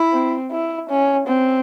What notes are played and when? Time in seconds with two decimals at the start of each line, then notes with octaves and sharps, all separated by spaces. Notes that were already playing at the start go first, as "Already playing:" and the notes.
Already playing: E4
0.12 C4
0.52 E4
0.90 C#4
1.28 C4